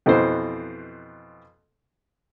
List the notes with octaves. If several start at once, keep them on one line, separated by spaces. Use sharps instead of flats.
F2 B2 E3 C5